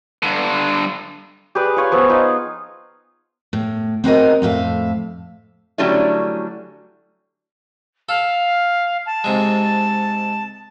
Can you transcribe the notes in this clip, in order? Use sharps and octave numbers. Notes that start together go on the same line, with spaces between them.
G2 D3
G4 G#4 B4 D5
F4 C#5 G#5
F3 B3 E5
D#4 F4
A2
C4 F#4 A#4 D#5
F2 A2 E5 F5
D3 F#3 G3 A3 C#4 E4
A4 F5
A5
G#2 C3 G#3